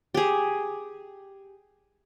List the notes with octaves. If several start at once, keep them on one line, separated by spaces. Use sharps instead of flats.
G4 G#4